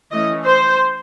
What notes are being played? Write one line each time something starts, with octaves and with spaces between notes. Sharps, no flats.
E3 A3 C#4 D#5
C5